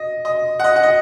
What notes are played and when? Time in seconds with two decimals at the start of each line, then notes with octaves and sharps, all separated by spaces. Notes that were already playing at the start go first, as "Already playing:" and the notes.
Already playing: D#5
0.25 D#5
0.60 F#5
0.64 D#5
0.76 F#5
0.83 D#5